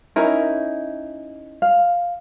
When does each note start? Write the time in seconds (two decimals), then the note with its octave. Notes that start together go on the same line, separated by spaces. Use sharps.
0.16 C#4 D#4 E4 A#4
1.62 F5